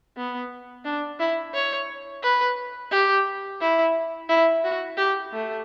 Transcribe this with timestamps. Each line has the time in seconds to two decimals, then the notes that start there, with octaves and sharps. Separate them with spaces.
0.17 B3
0.85 D4
1.20 E4
1.54 C#5
2.23 B4
2.91 G4
3.60 E4
4.29 E4
4.64 F#4
4.98 G4
5.33 A3